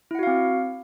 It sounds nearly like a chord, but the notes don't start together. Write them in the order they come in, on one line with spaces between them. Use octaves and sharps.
E4 F#5 F#4 F5 C4